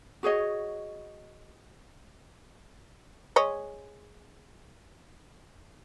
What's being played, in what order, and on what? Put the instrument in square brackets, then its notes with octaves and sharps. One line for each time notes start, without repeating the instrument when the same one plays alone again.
[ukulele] F#4 G#4 C#5 D#5
[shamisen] G#3 C#5 D#5